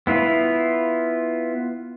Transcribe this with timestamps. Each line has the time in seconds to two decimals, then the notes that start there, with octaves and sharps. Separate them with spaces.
0.07 B3 E4 F4